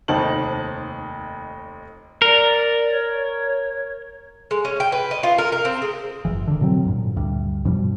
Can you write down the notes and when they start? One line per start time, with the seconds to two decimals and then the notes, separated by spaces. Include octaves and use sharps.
0.08 F1 D#2 D#4 C5 A5 F#7
2.22 A#4 D5
2.90 C#5
4.51 G#3
4.65 C#4
4.80 G5
4.92 B4
5.11 D#5
5.23 F4
5.38 A#4
5.52 A#4
5.65 C4
5.82 G#3
6.25 F#1 E3
6.47 D3 D#3
6.61 B2 D3 F#3 C4
6.86 G2 A#2
7.16 D2 G2
7.65 G2 B2 F3 G3